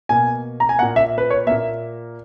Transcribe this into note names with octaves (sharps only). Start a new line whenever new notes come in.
B2 A#3 G#5
A#5
G#5
A#2 A#3 F#5
E5
B4
C#5
A#2 A#3 E5